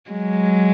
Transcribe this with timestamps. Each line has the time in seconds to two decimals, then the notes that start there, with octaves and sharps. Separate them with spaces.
0.11 F#3 G#3